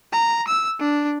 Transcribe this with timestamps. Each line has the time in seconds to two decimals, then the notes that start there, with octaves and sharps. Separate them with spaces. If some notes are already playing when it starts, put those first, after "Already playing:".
0.13 A#5
0.48 E6
0.80 D4